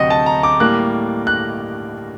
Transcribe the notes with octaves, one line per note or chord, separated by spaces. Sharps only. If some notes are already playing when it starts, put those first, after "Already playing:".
Already playing: D2 C3 F#3 C4 D#5 F#5
A5
A#5
D6
A2 G3 A#3 F#6
F#6